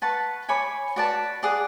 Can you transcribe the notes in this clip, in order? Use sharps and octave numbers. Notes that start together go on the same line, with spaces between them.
B4 F#5 A5 C#6
C#5 G#5 B5 D6
F#4 B4 D5 A5
G#4 D5 F#5